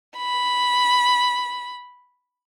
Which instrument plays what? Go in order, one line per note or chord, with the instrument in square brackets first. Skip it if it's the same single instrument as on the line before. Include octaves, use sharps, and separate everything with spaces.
[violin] B5